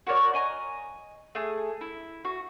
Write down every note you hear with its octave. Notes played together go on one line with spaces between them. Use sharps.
F#4 A#4 C#5 D5
D#5 G#5 A#5
A3 G#4
E4
F#4